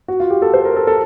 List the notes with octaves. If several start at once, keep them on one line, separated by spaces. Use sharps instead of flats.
F#4
F4
G4
A4
C5
A#4
A4
A4